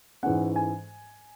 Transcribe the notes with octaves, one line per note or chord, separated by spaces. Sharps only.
G#2 E3 G#3 C#4 F#5
G#5